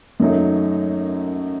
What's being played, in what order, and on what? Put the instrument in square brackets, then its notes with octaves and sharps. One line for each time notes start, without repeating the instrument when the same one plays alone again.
[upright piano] F#2 D#3 F#3 A3 D#4